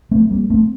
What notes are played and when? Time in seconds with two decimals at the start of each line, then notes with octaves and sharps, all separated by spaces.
0.11 A3 C4
0.31 G3 A#3
0.50 A3 C4